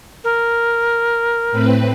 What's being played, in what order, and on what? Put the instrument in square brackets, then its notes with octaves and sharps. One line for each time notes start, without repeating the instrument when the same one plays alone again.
[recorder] A#4
[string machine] A2 C4 B4